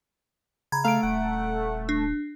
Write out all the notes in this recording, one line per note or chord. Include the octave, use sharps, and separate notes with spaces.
C#3 A#5 B5 G#6
A3 F5 A#5 D7
D#1 F#5
D4